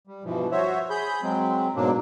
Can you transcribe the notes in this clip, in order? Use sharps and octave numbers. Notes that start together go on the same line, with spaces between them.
G3
G2 B2 E3 F3
F#4 C5 C#5 E5
G#4 B5 G6
F#3 G#3 C4
G#2 B2 F#3 A#3 D4